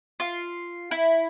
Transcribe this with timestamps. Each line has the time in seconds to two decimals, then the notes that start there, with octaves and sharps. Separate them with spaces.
0.20 F4
0.91 E4